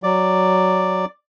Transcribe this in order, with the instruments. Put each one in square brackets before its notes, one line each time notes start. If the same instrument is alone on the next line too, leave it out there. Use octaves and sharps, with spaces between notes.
[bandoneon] F#3 [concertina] D5